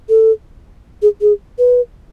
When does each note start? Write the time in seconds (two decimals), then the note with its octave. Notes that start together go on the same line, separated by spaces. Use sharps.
0.09 A4
1.02 G#4
1.21 G#4
1.58 B4